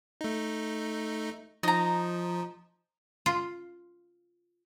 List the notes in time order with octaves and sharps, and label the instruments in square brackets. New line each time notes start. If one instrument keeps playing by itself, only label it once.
[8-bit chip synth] A3 D#4
[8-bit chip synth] F3 [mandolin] D#4 A#5
[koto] F4